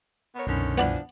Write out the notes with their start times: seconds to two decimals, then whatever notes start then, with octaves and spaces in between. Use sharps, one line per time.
0.35 B3 A#4 C#5
0.47 C2 F#2 B2 D3 D#3 C#4
0.78 E3 F3 B3 D4 D5 B5